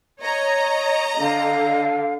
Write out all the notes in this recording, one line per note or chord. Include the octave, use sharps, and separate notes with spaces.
C#5 D#5 A#5
D3 F5